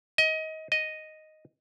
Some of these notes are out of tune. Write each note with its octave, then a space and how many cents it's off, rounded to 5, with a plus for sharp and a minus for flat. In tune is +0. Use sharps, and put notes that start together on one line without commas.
D#5 +25
D#5 +0